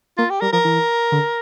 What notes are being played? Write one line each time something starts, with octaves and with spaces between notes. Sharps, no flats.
A#3 F4
G4
G3 A#4
F3 A#4
E3
D3